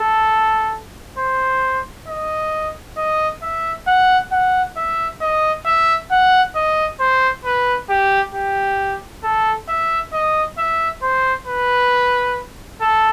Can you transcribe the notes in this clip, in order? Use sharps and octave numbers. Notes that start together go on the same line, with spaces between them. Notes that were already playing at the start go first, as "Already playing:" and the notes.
Already playing: A4
C5
D#5
D#5
E5
F#5
F#5
E5
D#5
E5
F#5
D#5
C5
B4
G4
G4
A4
E5
D#5
E5
C5
B4
A4